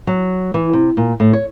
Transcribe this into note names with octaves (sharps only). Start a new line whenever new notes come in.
F#3
E3
C3
A#2
A2
C#5